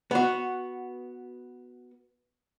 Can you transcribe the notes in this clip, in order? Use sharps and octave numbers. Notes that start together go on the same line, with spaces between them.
B3 F#4